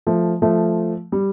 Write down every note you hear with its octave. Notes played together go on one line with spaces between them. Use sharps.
F3 A3
F3 A3
G3